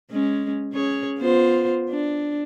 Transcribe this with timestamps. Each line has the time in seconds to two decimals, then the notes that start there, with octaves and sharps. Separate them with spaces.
0.11 G#3 C#4
0.73 C#4 G#4 C#5
1.18 B3 F4 C5
1.90 D4